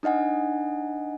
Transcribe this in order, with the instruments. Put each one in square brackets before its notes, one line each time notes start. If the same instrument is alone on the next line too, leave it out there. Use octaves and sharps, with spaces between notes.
[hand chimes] D4 D#4 D#5 F#5 G#5